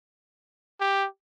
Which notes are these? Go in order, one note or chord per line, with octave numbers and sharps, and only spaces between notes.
G4